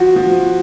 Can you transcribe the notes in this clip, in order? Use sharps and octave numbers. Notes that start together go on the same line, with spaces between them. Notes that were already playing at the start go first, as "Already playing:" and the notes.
Already playing: F3 F#4
F3